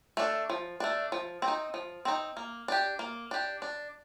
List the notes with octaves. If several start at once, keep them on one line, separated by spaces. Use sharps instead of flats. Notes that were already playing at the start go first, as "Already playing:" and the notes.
A3 D4
F3
A3 D4
F3
C4
D#4
F3
C4 D#4
A#3
D4 G4
A#3
D4 G4
D4